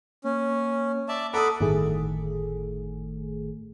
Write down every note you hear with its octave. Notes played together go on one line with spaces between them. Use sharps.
A#3 C#4
D5 E5 A5
A4 F#5 A#5 B5 D6 D#6
G1 A2 D#3 A3 G#4